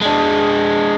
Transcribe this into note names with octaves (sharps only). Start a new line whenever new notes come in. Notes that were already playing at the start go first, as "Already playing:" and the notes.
G#3 D4